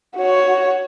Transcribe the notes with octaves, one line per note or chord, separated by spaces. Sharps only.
F#4 C#5